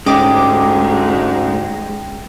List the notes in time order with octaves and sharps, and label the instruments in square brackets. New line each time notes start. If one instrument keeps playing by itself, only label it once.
[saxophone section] D2 G#2 [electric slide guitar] G#3 [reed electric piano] C#4 [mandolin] G4 D#5 D6